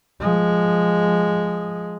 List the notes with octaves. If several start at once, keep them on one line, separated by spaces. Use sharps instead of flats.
F3 G#3